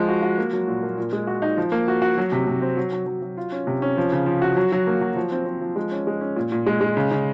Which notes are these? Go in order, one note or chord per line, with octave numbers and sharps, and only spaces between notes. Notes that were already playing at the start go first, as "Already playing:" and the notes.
Already playing: F3 G#3
F#4
F#4
A#3
F#3
A#2
A#3
A#2
G#3
F#4
D#4
F3
A#3
F#4
F#4
F#3
C3
C3
C4
F#3
F#3
F#3
F#3
F4
C#4
C3
C#4
F3
C#3
F3
F#4
F#3
F#3
A#3
F#3
F3
C4
C4
F3
G#3
C#4
G#3
C#4
A#2
A#2
G#3
G#3
C#3
C#3